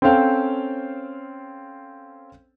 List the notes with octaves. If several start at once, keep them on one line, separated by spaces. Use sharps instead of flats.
C4 C#4 A4 C5 F5 G5